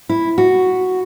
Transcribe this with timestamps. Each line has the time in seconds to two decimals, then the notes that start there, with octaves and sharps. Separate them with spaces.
0.09 E4
0.38 F#4